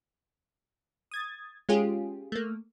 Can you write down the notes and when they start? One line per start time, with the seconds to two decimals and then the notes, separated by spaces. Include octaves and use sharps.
1.11 D#6 G#6 A6
1.69 G#3 C#4 F4 G4 G#4
2.32 A3 A#3